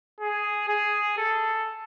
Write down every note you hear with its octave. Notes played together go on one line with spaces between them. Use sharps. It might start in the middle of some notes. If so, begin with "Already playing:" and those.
G#4
G#4
A4